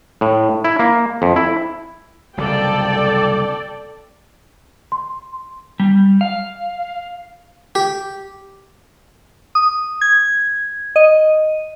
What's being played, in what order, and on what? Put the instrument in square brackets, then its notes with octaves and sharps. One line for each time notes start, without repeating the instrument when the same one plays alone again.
[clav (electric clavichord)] A2
E4
A#3
F2
E4
[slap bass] F#1 C2 B2 [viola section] A4 D5 G5
[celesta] C6
[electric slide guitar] G3
F5
[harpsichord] G4
[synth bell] D#6
G#6
D#5